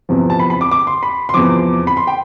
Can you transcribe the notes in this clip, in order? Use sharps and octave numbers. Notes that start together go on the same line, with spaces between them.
E2 C3 F3
A5
B5
B5
D6
D6
C6
B5
C6
E2 C3 F3 D6
B5
C6
G5